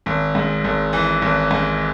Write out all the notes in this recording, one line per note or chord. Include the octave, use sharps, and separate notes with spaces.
G#1
G#2
G#1
E3
G#1
G#2